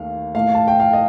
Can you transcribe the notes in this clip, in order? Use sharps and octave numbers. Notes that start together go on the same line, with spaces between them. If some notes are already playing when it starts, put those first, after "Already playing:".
Already playing: D#2 D#3 A3 F5
A2 A3 F5
A5
G5
F5
D#5